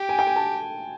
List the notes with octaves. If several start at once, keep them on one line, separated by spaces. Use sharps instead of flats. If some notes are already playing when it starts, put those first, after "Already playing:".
Already playing: G4 G5
G#5
G5
G#5
A5